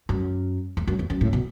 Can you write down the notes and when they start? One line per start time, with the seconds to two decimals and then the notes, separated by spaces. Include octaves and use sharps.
0.09 F#2
0.77 E2
0.87 F#2
0.99 E2
1.10 F#2
1.21 A2
1.33 B2